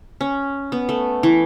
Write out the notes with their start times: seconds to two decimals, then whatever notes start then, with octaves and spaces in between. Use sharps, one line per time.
0.21 C#4
0.72 B3
0.89 A3
1.23 E3